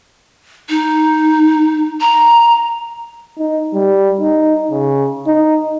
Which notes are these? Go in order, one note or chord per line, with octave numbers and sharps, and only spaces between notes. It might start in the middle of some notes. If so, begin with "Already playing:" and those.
D#4
A#5
D#4
G3
D#4
C#3
D#4